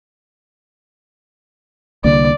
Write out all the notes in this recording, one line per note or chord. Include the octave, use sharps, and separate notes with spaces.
C2 D3 A#3 D5